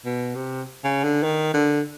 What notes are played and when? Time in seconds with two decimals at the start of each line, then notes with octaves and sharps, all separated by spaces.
0.05 B2
0.35 C3
0.84 C#3
1.04 D3
1.23 D#3
1.54 D3